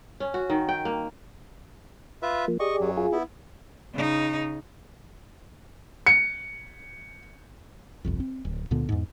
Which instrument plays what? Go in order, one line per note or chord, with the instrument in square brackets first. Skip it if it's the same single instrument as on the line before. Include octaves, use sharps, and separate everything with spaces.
[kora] C#4
F#4
D#3
G5
A#3
[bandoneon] F4 B4 E5
[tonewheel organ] F3 A#3
[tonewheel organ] G4 G#4 D5 [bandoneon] D#5 C#6
[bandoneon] F#2 F#3
[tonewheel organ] F4 G#4
[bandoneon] B3 E4
[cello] C#3 D#4
[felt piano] C#7
[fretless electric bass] G1 C2 F2
C4
D1
C#2 A#2 D3 B3
E2 G#2